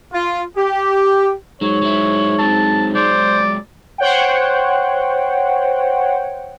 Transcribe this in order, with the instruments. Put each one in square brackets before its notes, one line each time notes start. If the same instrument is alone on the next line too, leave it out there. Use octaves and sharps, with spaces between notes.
[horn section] F4
G4
[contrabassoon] G#2 [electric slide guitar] F#3 [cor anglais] C#5
[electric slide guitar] F#3 E4
[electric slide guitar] F#3 C4 [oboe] A5
[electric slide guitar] F#3 G#3 [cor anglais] C5 [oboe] D5
[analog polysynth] C5 C#5 F#5 G5